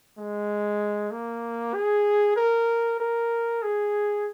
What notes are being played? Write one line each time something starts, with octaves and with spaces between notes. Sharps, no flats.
G#3
A#3
G#4
A#4
A#4
G#4